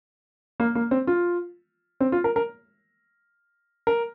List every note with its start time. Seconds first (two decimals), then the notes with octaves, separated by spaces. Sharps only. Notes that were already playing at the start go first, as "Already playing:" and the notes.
0.60 A#3
0.75 A#3
0.91 C4
1.07 F4
2.01 C4
2.12 F4
2.24 A#4
2.36 A#4
3.87 A#4